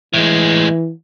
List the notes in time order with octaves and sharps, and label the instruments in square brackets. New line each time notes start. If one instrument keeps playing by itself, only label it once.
[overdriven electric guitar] A2 G#3 [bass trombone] E3